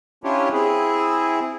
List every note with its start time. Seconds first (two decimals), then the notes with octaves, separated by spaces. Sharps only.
0.24 C#4 D4 E4 F4 G4 C#5
0.53 C4 E4 G#4